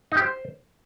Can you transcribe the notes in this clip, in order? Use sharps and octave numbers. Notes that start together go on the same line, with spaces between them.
D#4
G4
C5